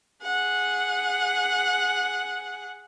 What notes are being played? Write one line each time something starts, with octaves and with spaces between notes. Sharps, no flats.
G#4 F#5